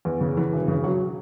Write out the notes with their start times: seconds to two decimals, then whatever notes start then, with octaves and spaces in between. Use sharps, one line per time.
0.05 E2
0.21 C#3
0.37 E3
0.52 E1
0.68 C#3
0.84 F#3